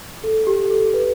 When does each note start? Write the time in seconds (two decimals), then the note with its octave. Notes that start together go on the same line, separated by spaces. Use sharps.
0.24 A4
0.47 G4
0.70 A4
0.94 B4